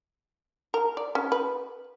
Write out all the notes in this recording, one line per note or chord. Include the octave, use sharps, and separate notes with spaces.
A#4
D5
C#4
B4